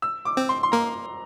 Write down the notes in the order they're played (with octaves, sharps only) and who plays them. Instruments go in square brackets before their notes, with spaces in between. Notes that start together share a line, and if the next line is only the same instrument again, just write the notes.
[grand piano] E6
D6
[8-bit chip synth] C4
[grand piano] C6
C6
[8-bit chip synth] A#3 [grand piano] A#5